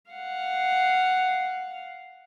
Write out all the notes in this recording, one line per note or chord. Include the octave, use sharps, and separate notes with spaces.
F5 F#5